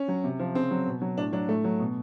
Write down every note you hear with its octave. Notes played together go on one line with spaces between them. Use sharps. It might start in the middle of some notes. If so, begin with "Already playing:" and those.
Already playing: C#4
F#3
C3
F3
C#3 C4
F#3
B2
F#3
A2 D4
F#3 D4
A2 A3
F#3
B2